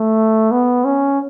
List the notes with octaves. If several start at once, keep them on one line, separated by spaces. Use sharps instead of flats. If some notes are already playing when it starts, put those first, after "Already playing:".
Already playing: A3
B3
C#4